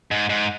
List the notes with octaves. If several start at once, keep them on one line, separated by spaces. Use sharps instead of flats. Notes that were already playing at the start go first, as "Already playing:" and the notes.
G#2
G#2